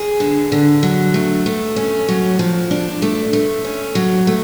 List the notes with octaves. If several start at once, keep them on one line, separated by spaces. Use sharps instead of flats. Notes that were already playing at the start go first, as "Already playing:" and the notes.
Already playing: G#4
D3
D3
F#3
A3
A3
C#4
F#3
F3
D4
A3
A3
C#4
F#3
A3